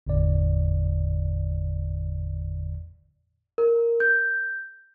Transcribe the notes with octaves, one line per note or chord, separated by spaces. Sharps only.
G1 E2 A2 D3 D5
A#4
G6